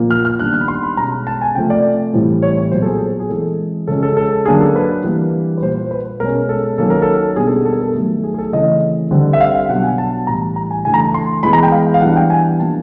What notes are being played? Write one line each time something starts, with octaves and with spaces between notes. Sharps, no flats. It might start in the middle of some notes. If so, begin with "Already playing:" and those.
Already playing: A#2 F3 A#3
F6
F6
D#3 G3 B3 D4 F#6
F6
B5
C6
B5
B2 G#3 C#4 A#5
A5
G#5
C3 F3 A3 G5
D5
A2 E3 G3 C4
C#5
C#5
A#2 F#3 B3 C5
A4
G#4
G#4
E3 G#3 C4 A4
C#3 F3 G#3 C#4 A4
A4
A4
D3 F#3 A#3 D4 G#4
A4
B4
E3 G3 A#3 D4
B4
A#2 G3 A#3 C5
C5
B4
B2 G#3 C#4 A#4
A4
D#3 F#3 A#3 C#4 A4
A#4
A4
B2 G3 B3 D4 G#4
A4
G#4
A4
A#4
A4
D#3 F#3 A3
G#4
G#4
A4
C#3 E3 A3 C4 D#5
D3 G3 C4
E5
F5
F5
B2 F#3 B3 D4 F#5
G#5
A5
A2 E3 G3 A#5
A#5
G#5
C#3 E3 A3 D4 G#5
A#5
A5
C6
E3 G#3 B3 B5
A#5
G5
F5
F5
E3 G3 B3 D4 F#5
G5
G#5
F3 A#3 D4 A5